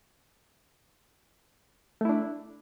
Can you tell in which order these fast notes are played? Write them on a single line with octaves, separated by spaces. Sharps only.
A3 E4 D4